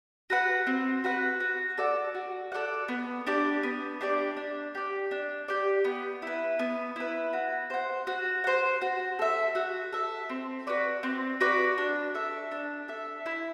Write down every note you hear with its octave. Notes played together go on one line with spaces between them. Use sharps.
F#4 B4 F#5
C4
F#4 B4 F#5
F#4
A4 D5 F#5
F#4
A4 D5 F#5
B3
D4 G4 D5
B3
D4 G4 D5
D4
G4 D5
D4
G4 D5
B3
E4 B4
B3
E4 B4
F#4
C5 F#5
F#4
C5 F#5
F#4
A4 E5
F#4
A4 E5
C4
F#4 B4 D5
C4
F#4 B4 D5
D4
A4 E5
D4
A4 E5
E4